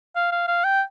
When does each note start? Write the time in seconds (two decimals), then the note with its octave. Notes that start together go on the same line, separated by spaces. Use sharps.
0.16 F5
0.32 F5
0.48 F5
0.64 G5